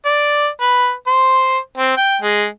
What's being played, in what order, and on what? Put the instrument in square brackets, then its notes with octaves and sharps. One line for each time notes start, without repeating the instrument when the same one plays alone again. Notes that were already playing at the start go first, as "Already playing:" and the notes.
[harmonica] D5
B4
C5
C4
G5
G#3